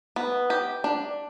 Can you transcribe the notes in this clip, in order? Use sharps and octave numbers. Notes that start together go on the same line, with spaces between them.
B3
G4
D4